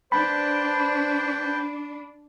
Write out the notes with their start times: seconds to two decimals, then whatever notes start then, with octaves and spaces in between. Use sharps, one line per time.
0.12 D4 B4 C5 G5 A5 B5